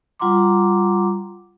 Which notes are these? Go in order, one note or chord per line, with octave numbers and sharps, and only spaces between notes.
G3 F4 F#5 A#5 C6 D6